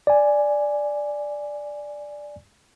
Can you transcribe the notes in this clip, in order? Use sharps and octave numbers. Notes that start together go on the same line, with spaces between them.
D5 G#5